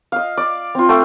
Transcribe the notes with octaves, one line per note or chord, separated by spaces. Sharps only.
D#5 F5
D5
C4 F4
A3 G5